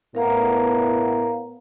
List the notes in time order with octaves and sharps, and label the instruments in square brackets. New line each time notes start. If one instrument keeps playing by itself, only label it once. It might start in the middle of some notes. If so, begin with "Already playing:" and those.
[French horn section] A2 B3 [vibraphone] A#4 F5 A#5